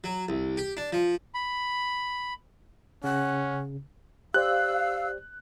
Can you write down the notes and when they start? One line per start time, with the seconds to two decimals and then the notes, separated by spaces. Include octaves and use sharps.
0.04 F#3
0.29 C2
0.57 G4
0.77 D4
0.93 F3
1.34 B5
3.04 C#3 C#4 F#5
4.34 G4 C5 D5 F5 E6 F#6